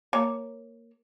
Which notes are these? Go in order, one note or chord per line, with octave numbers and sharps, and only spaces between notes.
A#3 C#5